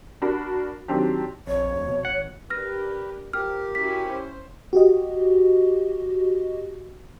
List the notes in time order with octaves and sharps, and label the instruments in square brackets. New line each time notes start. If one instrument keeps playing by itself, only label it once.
[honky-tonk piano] D4 F#4 A#4 B5
D#3 F#3 C4 D4 G4
[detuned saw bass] A#1 [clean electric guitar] F2 [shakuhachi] C#5
[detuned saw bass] D2
B2
[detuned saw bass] G#1 [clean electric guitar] F#5
[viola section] D4 G4 A#4 [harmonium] B4 [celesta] F6 A#6
[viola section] F3 [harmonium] G4 [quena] A#4 [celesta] F6
[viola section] C#4 E4 F#4 [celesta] B6
[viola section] C5
[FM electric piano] F#4 G4 D#5